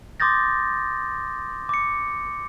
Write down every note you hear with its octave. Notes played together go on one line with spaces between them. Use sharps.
C6 D6 D#6 G6 A6 A#6
D6 C#7